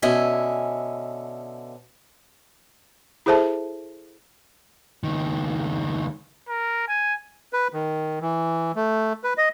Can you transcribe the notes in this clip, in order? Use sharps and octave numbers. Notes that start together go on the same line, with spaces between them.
B2 D3 C#4 D#5 E5 G#5
E4 G#4 A4 C5 E5 A5
C#2 D#3
A#4
G#5
B4
D#3
E3
A3
B4
D#5